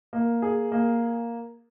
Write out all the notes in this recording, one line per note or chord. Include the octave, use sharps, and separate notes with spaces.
A#3
G#4
A#3